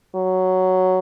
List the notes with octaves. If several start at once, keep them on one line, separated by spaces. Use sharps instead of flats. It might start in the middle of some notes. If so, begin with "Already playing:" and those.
F#3